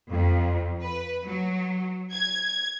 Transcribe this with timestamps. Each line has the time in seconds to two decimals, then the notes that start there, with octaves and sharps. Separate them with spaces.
0.12 F2
0.83 B4
1.25 F#3
2.13 G#6